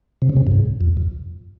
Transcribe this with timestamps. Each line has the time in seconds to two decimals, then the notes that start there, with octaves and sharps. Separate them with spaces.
0.22 C3
0.29 C#3
0.37 C3
0.47 G2
0.51 G#2
0.81 F2
0.97 F2